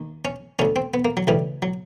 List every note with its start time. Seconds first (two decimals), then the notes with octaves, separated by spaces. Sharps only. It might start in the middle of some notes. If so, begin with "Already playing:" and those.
Already playing: D#2
0.25 C#4
0.59 D2 D3 C#4
0.76 C4
0.94 B3
1.05 A#3
1.17 F#3
1.27 D2 C#3 E3 G3
1.62 F#3